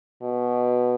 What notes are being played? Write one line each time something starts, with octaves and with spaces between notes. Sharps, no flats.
B2